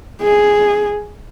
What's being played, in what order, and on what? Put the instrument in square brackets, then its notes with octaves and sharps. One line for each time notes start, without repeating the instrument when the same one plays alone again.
[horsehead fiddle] G#4